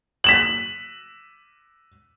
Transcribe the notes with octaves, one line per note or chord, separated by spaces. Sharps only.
B6 E7 F#7